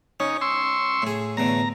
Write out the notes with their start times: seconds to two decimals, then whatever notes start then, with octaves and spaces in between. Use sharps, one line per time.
0.20 C#4 D#4 C#5
0.41 C6 C#6 E6
1.02 A2 G#4
1.37 E2 A2 D3 A#5